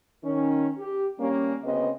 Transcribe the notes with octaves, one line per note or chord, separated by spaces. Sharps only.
D#3 C#4
G4
G3 A#3 C#4
D2 C#3 B3 C4 B4 D#5